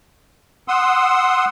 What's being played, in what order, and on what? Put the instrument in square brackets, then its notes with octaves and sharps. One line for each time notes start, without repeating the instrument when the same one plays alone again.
[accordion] F#5 C6 D#6 E6